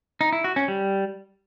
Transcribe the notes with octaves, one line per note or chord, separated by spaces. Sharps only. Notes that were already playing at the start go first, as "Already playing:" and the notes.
D#4
E4
F#4
C#4
G3